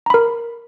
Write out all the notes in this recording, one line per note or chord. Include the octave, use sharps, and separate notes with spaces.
A#4 A#5 B5